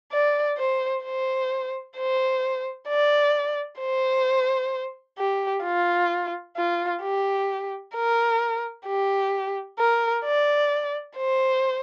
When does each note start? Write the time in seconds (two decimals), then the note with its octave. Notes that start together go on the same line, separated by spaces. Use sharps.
0.12 D5
0.58 C5
1.05 C5
1.97 C5
2.88 D5
3.80 C5
5.18 G4
5.64 F4
6.57 F4
7.03 G4
7.95 A#4
8.86 G4
9.79 A#4
10.25 D5
11.17 C5